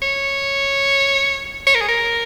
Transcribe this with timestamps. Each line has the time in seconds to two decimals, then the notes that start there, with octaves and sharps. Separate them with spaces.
0.02 C#5
1.67 C#5
1.75 A#4
1.81 G#4
1.88 A#4